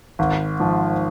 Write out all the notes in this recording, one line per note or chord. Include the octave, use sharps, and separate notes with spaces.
G#1
G#2 F3